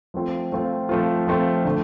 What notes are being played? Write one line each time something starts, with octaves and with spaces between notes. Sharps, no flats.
F3 A3 C4 F4
F3 A3 C4 F4
F3 A3 C4 F4
F3 A3 C4 F4
D3 A3